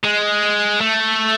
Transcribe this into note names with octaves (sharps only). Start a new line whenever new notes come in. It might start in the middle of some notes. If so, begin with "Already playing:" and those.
G#3
A3